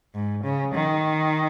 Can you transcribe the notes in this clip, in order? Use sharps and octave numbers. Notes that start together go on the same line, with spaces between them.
G#2
C#3
D#3